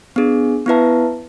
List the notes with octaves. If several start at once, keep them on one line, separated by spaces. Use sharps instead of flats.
B3 D4 G#4
B3 E4 B4 E5 A5